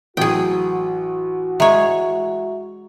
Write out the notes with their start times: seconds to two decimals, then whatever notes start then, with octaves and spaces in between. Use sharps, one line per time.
0.17 A1 F#3 F#4 G#4 G5
1.60 G#3 C#5 E5 A#5 C#6